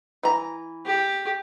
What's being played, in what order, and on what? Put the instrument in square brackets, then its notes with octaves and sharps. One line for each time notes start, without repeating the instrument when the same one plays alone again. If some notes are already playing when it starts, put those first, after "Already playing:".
[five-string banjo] E3 A#5
[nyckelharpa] G4